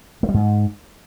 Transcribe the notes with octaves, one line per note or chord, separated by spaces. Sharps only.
A3
G3
G#2